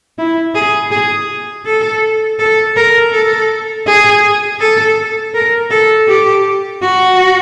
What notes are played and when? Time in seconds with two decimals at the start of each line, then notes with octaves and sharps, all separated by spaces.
0.18 E4
0.55 G#4
0.91 G#4
1.66 A4
2.39 A4
2.76 A#4
3.13 A4
3.87 G#4
4.60 A4
5.34 A#4
5.71 A4
6.08 G4
6.82 F#4